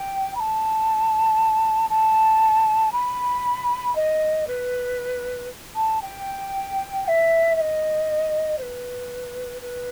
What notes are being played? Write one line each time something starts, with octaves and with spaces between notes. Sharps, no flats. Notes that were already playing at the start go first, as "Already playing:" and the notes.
Already playing: G5
B5
A5
A5
B5
D#5
B4
A5
G5
G5
E5
E5
D#5
C5
B4
B4